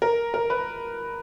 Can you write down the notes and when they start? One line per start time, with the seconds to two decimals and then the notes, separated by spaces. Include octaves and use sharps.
0.02 A#4
0.34 A#4
0.50 B4